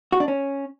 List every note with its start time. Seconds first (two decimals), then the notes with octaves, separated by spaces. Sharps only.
0.12 F#4
0.20 D4
0.28 C#4